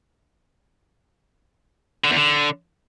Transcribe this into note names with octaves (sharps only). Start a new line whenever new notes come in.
D3
E2
D3